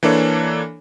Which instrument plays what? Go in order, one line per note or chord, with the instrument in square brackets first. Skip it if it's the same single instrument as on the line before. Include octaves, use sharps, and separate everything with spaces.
[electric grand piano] E3 A#3 D4 A4 C#5